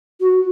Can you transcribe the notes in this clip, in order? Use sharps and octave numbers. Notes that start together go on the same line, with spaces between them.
F#4